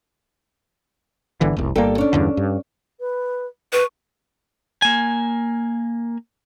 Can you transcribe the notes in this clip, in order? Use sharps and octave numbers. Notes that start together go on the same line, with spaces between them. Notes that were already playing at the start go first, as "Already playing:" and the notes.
G1 D3 E3
F1 C2
G1 G3 A#3 G4 A4
C#4 D4
E2 G2 D3
G2
B4
B4 C#6
A#3 G#5